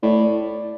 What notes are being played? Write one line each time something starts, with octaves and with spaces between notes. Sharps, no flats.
A2 D5